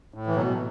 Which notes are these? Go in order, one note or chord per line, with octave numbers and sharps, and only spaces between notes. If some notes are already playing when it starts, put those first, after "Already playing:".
A2
E3
B2 F#3